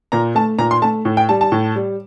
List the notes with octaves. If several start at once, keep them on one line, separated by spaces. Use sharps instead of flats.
A#2 A#5
A3 A5
A#2 A#5
C6
A3 A5
A2
G5
G3 A5
A5
A2
G3